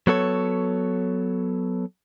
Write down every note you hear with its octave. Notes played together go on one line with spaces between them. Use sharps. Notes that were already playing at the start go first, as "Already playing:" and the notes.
F#3 B3 A4 C#5